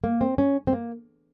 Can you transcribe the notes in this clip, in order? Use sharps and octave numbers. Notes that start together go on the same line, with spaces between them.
A#3
C4
C#4
C4
A#3